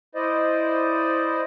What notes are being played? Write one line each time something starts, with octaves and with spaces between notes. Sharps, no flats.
E4 C5 D5 D#5